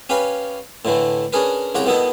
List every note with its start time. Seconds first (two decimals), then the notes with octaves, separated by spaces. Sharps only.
0.09 C#4 G4 B4 F5 G#5 B5
0.85 A2 D3 E3 A3
1.33 C#4 D4 G#4 A#4 B4
1.75 C2 C#3 G4 F#5 G5 A#5
1.86 B2 D#3 B3 D#4 E4 A4